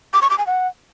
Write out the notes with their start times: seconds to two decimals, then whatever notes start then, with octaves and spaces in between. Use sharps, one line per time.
0.13 D6
0.22 C#6
0.30 D6
0.38 G#5
0.46 F#5